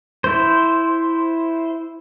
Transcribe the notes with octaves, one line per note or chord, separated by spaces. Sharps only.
E4 C5